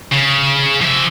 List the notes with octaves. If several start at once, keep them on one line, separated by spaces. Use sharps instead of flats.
C#3
F3 E5